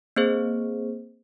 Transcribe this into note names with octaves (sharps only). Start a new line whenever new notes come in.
A#3 C4 G#4 C5